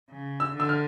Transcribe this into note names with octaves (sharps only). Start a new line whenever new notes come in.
C#3
E6
D3
E6
F6